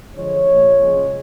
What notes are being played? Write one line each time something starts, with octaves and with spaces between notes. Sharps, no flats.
D3 F3 G#3 C#5
A#2 F3 G#3
C#3 F3 G#3